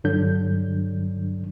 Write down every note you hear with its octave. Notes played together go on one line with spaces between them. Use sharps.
G2 D3 F#3 D4 G6